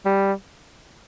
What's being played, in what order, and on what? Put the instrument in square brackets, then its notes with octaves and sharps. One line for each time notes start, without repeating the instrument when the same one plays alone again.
[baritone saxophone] G3